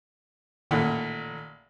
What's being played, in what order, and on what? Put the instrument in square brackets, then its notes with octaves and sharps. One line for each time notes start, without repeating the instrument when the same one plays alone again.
[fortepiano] A1 A#2 F#5 [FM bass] D#3